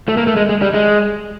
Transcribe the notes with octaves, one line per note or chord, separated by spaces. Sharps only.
A3
A#3
A3
G#3
G#3
G3
G#3